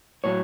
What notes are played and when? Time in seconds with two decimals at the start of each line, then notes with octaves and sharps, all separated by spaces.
0.24 A2 F#3 C#5